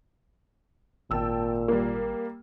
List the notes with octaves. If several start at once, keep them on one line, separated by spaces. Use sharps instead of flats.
G#1 A#2 G5 A5 E6
G3 A#3